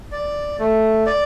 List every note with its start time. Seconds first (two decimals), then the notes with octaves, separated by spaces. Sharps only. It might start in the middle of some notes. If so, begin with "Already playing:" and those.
0.12 D5
0.59 A3
1.06 D5